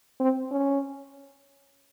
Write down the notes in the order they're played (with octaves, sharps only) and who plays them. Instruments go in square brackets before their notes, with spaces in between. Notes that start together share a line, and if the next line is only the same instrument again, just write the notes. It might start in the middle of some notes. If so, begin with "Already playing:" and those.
[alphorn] C4
C#4